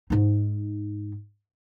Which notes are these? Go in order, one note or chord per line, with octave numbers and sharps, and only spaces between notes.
G#2 D#4